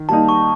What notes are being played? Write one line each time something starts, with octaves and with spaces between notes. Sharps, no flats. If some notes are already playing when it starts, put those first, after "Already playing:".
Already playing: D#3
G3 A#3 D#4 A5
C#6